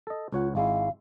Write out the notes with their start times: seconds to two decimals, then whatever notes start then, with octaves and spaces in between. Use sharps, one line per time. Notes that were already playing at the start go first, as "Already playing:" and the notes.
0.07 A4 D#5
0.32 C#2 F4 C#5 F#5
0.55 G#1 G#3 E4 F5